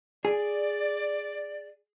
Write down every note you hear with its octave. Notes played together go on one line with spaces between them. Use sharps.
G#4 D5